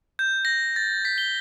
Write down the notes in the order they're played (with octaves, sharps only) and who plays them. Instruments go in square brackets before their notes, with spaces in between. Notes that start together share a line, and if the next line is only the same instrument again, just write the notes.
[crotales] G6
A#6
A6
B6
G7